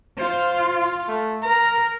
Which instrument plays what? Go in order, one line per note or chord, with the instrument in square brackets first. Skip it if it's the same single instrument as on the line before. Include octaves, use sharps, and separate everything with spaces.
[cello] F4 [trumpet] C5
[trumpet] A3
[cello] A#4 [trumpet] A#5